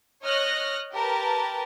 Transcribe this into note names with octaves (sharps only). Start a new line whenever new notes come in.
C#5 D#5 F6 F#6 A#6
G4 A#4 B4 A5